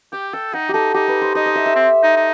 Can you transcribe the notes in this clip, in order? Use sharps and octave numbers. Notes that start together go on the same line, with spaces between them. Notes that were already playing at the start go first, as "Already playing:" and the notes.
G4 G5
A4 G5
D#4 F#5
D#4 G4 A4
D#4 G4
B4
C5
D#4 D#5
D#5
E5
E5
C4
D#4
D#4